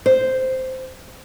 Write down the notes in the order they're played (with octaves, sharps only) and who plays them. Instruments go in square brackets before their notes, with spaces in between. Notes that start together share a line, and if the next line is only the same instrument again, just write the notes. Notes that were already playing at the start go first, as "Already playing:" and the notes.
[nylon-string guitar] C5